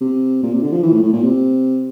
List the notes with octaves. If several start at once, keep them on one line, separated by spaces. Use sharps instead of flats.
C3
A#2
C3
D3
F3
E3
A2
A2
A#2
C3